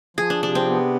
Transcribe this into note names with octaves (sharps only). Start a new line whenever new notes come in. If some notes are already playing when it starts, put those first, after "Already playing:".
F3 G#4
D4
C3 D4
C4
B3